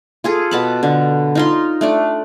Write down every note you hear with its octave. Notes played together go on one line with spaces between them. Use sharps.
F4 G#4 A4
B2 A5 B5
D3
D#4 F4 C6
A3 D4 D5